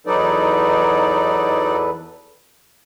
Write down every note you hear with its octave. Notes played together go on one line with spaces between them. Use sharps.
E2 F#3 D#4 A4 B4 D5